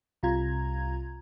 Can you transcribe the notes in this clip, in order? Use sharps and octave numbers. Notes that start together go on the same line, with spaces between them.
C2 C3 F4 A#5 G#6